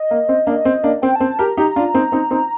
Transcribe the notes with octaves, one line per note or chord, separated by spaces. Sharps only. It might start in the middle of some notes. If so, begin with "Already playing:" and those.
Already playing: D#5
A#3
C4
A#3 D4
C4
A#3 D4
C4 G5
C4 A5
A5
G4 A#4
A#5
D#4 G4 A#5
D4 F4
C4 D#4
C4 D#4
C4 D#4